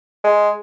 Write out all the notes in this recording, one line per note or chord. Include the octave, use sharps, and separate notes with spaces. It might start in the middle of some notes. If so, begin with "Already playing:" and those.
G#3